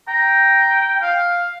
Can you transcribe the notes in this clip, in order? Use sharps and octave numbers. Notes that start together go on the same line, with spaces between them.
G5 A#5
F5